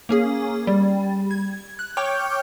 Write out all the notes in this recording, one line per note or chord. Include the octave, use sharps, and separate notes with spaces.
A#3 C#4 G#4
G3
G#6
F#6
C#5 G5 C#6 D6 F6 G6